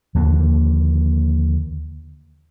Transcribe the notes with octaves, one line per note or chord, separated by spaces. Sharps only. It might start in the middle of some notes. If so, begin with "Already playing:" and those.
D#2 D3 F3 A#3